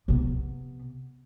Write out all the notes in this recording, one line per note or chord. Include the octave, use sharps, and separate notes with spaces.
C3 B3